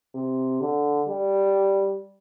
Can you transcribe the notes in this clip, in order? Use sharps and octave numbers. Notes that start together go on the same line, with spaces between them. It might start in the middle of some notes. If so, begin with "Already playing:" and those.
C3
D3
G3